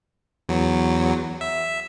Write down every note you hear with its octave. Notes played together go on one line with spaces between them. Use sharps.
E2 F#3
E5